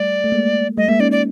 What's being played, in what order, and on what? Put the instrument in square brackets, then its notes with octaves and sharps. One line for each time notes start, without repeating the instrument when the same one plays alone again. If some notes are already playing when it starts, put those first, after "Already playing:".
Already playing: [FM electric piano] G3 A3 [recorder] D5
[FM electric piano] A3
G#3 A#3
[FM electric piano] G3 A3 [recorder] D#5
[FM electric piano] G#3 A#3 [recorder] E5
[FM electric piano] C#4 D#4 [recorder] D5
[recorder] D5